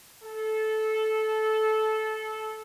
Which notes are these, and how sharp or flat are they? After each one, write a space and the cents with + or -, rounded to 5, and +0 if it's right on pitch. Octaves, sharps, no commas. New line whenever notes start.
A4 -15